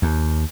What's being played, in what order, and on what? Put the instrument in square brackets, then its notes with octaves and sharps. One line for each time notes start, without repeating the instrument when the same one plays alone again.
[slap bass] D#2